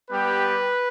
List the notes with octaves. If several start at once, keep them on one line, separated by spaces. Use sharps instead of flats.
G3 B3 G4 B4